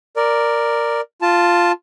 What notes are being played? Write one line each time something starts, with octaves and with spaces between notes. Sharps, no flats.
A#4 D5
F4 A5